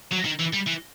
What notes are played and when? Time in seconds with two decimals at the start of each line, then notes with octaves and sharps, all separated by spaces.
0.12 F#3
0.25 D#3
0.39 E3
0.53 G3
0.66 E3